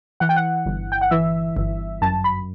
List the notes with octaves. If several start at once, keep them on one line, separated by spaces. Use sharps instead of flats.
E3 F#5
G5
F#5
G1
G5
F#5
E3 E5
G1
F#2 A5
B5